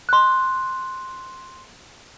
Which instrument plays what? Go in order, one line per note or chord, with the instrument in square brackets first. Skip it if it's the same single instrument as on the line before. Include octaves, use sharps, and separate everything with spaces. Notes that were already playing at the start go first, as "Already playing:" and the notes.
[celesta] C6 F#6